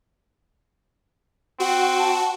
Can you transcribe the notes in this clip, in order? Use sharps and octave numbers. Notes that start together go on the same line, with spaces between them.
C4 F#4 F#5
A5